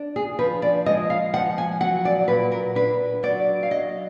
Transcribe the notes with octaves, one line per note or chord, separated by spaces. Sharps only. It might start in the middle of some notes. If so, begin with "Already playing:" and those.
Already playing: D4
G#4
F3 B4
D5
G#3 D#5
F5
F3 F#5
G#5
F#3 F#5
D5
A#2 B4
A#4
D4 B4
F#3 D5
F5
F#3 D#5